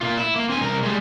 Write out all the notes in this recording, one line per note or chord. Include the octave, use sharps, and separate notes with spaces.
A#2 F4
E4
A#3
C4 G#5
C2 A#4
G3 G#3